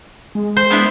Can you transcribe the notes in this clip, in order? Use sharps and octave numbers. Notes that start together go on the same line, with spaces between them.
G#3
C5
B3 D4 E4